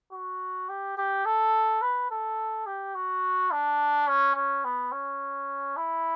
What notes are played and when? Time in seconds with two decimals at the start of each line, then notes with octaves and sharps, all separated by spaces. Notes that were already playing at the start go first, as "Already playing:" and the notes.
0.12 F#4
0.69 G4
0.97 G4
1.25 A4
1.82 B4
2.10 A4
2.66 G4
2.95 F#4
3.51 D4
4.08 C#4
4.35 C#4
4.64 B3
4.92 C#4
5.77 E4